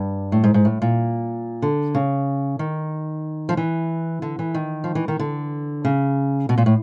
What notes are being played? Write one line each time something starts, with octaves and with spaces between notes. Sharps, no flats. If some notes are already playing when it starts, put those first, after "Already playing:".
Already playing: G2
A2
G#2
G#2
A2
A#2
D3
C#3
D#3
F3
E3
D3
E3
D#3
F3
E3
D#3
D3
C#3
B2
A#2
A2